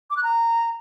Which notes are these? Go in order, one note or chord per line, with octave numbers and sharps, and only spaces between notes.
D6
F#6
A#5